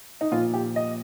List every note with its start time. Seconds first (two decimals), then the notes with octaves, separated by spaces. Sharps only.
0.21 D#4
0.32 A#2 F3 F4
0.54 G4
0.76 D#5